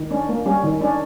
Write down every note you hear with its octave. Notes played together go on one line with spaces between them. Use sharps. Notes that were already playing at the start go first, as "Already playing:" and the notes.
Already playing: D#3
C#4 D4
A#3
G3 C#4
D#3
C#4 D4